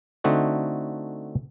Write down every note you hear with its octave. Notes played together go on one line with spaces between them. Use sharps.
D3 A3 C4 D#4 F#4